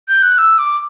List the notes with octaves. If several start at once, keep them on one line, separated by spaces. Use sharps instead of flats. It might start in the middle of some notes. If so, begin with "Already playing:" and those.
G6
F#6
E6
D6